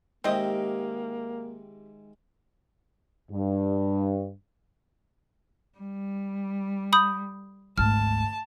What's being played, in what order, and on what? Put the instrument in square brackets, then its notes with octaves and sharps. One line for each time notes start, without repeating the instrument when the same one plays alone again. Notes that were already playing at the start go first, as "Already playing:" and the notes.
[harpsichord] G#2 D#3 E5 [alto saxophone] A#3 [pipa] C4 D#5 [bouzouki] G4
[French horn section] G2
[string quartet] G3
[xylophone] B5 D#6 G6
[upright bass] G#1 D2 [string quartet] A5 [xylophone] F6